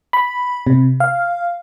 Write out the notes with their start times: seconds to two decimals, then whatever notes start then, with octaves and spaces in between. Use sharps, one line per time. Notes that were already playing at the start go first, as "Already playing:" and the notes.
0.13 B5
0.67 C3
1.00 F5